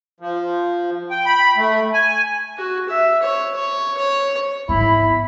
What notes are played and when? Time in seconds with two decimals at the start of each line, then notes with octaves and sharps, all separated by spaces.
0.20 F3
1.10 G5
1.26 B5
1.57 A3
1.94 G#5
2.58 F#4
2.89 E5
3.22 C#5
3.55 C#5
3.97 C#5
4.69 G#2 B3 E4 B5